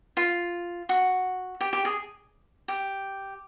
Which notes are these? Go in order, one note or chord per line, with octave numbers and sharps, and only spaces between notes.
F4
F#4
G4
G4
G#4
G4